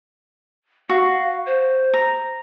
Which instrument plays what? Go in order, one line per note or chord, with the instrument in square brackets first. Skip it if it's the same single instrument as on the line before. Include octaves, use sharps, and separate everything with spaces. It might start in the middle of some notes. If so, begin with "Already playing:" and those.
[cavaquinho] F#4 [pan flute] F5
[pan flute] C5
[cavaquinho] A#5